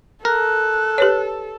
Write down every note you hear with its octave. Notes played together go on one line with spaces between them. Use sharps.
A4 A#4 F#6
G4 B4 C#5